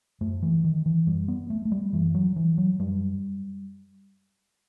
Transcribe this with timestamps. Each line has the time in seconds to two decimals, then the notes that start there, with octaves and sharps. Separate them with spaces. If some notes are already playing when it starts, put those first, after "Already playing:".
0.21 F#2 A3
0.42 E3
0.64 D#3
0.86 E3
1.07 F#2 G3
1.28 B3
1.50 A3
1.65 A3
1.72 G3
1.93 F#2 E3
2.15 F#3
2.36 E3
2.58 F#3
2.79 F#2 G3